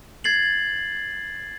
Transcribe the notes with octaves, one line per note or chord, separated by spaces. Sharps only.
G#6 A6 C7 F#7